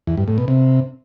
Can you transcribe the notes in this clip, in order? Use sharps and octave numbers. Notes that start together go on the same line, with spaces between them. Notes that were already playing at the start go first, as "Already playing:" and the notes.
E2
G2
A2
B2
C3